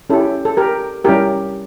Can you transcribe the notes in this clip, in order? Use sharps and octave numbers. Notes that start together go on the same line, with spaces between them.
C#4 E4 G4 A4
A4
G4 A#4
G3 C#4 E4 G4 A#4